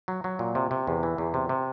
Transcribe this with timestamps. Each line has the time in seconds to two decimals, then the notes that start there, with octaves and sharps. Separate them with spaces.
0.08 F#3
0.24 F#3
0.39 A#2
0.55 C3
0.71 C3
0.87 E2
1.03 E3
1.18 E2
1.34 C3
1.49 C3